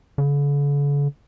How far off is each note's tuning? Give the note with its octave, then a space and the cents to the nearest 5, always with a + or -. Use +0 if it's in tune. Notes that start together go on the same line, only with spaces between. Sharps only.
D3 -45